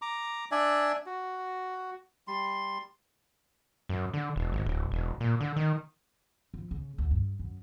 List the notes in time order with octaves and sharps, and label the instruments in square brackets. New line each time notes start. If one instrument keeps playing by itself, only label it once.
[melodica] A#5 D6
D4 D5 E5 G#5
F#4
G3 C6
[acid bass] F#2
D3
E1
G#1
D1
E1
A#2
D3
D#3
[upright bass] F3
C#3
D2
G2
F#2